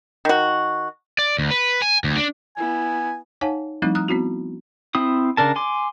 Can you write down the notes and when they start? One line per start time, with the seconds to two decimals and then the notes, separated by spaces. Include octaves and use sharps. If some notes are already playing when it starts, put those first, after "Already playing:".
0.25 D#3 F#4
1.19 D5
1.38 D2
1.51 B4
1.82 G#5
2.04 D2
2.17 D4
2.57 B3 E4 G#5
3.41 D#4 C#5 F5 F#5 G#5 A5
3.82 F3 G3 A3 C4 D#4 E4
3.95 A#5 D#6 F6 F#6
4.08 B3 C4 E4 F#4
4.95 C4 E4 D#6
5.37 C#3 D4 A#4 A5
5.56 G#5 C6 D6